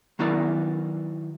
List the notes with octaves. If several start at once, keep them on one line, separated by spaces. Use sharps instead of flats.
D#3 F#3 B3 E4 A#4 D5